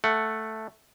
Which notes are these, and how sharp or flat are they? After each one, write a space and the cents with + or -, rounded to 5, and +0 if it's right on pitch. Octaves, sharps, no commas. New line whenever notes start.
A3 +0 F#5 +0